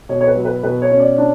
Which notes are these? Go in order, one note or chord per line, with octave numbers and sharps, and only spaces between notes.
B2 C#5
C#5
B4
F#3
B4
B2 B4
C#5
C#4
D5
D4